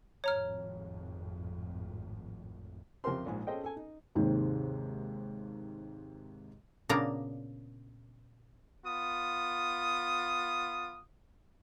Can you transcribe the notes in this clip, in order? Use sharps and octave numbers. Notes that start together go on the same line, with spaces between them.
G#1 F2 A2 C#5 A#5 F6
F2 C3 G4 A#4 C5 C6
A#1 G#2
C#4 G#4 A4 C5 D#5 G5
A4 G#5
D#4
D#2 G#2 C3 D#3
A#2 C#3 A#3 B3 D4 A#5
B3 F4 D#6